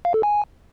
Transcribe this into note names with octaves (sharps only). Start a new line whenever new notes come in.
F5
A4
G#5